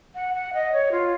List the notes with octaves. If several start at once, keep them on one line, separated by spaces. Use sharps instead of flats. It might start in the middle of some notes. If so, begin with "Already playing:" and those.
F#5
F#5
D#5
C#5
F4